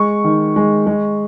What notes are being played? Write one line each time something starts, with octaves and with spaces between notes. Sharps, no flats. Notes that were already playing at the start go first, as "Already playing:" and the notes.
Already playing: G#3 C#6
D#3
G#3
G#3